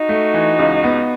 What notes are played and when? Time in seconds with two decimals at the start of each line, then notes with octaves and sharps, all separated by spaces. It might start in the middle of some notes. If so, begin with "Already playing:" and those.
Already playing: D#4 F#4
0.09 A3
0.34 E3
0.59 C#2
0.84 B3